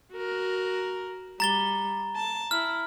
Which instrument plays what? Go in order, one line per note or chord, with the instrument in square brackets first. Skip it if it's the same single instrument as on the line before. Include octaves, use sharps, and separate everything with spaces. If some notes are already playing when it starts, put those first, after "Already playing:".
[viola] F#4 A#4
[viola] G3 [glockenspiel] A#5 A6 G7
[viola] A5
[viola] E4 [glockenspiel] F6